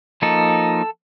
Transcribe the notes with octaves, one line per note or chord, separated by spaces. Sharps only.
F3 A#3 D#4 A4